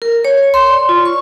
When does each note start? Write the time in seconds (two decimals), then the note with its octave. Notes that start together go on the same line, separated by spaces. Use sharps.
0.02 A#4
0.25 C#5
0.54 C6
0.69 D5
0.89 F4
1.05 C#6